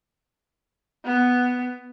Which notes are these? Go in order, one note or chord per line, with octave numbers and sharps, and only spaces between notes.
B3